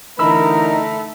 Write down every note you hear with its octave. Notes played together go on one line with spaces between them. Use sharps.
D3 E3 A3 D#4 A#4 A#5 B5 E6